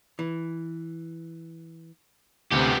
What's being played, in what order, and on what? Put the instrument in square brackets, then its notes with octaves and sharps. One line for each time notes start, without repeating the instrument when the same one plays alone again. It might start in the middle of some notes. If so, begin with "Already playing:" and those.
[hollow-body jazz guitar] E3
[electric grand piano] D2 C3 [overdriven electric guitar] B3 G4